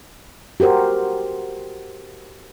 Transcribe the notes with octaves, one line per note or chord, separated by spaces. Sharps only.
F#4 G4 A#4 C5